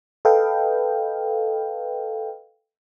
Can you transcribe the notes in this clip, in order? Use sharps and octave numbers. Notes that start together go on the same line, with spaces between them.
A4 B4 D#5 F5 G5